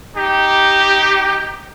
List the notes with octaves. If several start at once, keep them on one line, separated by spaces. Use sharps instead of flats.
D#4 G4